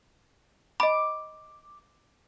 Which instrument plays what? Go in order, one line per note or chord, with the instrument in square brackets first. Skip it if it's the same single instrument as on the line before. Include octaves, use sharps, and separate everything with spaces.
[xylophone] D#5 B5 [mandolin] D6